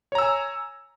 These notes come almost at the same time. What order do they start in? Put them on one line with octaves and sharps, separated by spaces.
C#5 A#5 E6 G#5